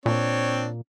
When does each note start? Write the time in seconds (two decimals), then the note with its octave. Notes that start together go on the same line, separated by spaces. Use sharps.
0.06 A#2 C4 D4 C#5